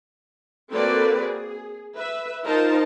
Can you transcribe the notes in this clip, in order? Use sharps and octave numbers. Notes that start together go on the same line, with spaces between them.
A#3 C4 F#4 A4 B4 D5
G#4
B4 E5
D#4 F4 A#4 C5 A5